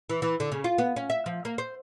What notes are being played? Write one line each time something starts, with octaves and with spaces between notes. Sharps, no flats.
E3
E3
D3
C#3
F4
B3
C#4
E5
F3
A#3
C5